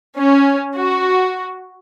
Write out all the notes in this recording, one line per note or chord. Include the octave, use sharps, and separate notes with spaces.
C#4
F#4